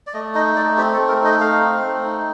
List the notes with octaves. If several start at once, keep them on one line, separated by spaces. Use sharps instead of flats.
D5
A3 D#5
D#4 D#5
A3 D5
C4 G4
A4
A3
A#4
D#4
D#5
A3 F5
C4
A3
D#4